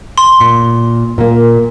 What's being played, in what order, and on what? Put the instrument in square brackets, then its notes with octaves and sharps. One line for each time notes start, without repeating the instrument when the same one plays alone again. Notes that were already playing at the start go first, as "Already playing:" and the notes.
[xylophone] C6
[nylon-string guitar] A#2
A#2 A#3